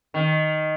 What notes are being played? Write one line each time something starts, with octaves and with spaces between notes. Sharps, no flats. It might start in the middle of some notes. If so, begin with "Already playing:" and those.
D#3